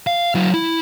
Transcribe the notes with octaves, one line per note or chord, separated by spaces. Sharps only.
F5
F#3 E4
E4